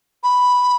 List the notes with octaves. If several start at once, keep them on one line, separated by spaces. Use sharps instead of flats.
B5